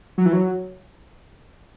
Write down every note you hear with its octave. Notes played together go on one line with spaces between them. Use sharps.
F#3
E3
F#3